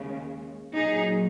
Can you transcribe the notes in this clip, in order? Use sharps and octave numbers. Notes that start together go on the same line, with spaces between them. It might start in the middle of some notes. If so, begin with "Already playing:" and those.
Already playing: D#2 C#3 G#3
A#2 F#3 D#4 G#4